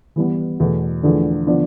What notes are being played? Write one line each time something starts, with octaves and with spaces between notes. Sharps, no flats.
E3 G3 B3
E2 B2 A3
E2 D3 F3 A3 D4
D3 F3 B3 D4